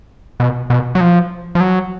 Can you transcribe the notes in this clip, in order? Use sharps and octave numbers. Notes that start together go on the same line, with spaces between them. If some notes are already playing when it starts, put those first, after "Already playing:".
B2
B2
F#3
F3
F3
F#3